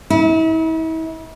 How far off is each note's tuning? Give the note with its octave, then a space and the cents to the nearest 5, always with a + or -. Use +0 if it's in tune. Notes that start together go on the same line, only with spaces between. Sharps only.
E4 -40